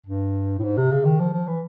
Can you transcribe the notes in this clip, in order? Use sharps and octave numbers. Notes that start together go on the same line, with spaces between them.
G2
A2
G#2
C3
C#3
D#3
F3
F3
E3